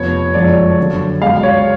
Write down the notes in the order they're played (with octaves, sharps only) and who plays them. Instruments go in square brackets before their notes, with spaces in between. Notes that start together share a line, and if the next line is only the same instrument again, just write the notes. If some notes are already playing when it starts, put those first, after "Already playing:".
Already playing: [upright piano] F1 F2 F3 B3 [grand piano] C#5
[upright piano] F#1 F2 F3 G#3 [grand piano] D5
[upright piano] F#2 D3 F#3
[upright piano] C#2 B2 G#3 [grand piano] F5
[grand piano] C#5